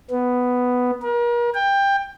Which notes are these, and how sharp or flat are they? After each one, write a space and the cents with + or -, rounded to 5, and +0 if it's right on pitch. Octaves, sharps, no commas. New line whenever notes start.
B3 +5
A#4 +40
G5 +20